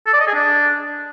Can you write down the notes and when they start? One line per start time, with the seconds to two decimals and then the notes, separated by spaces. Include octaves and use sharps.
0.07 A4
0.13 D5
0.20 D#5
0.27 G#4
0.34 D4